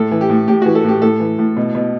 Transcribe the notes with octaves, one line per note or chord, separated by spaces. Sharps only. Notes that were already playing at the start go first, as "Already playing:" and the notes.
Already playing: A2 A4
E3
G4
A2
A2 G4
E3 F#4
A4
A2 G4
A2 A4
E3
A2
B2
B2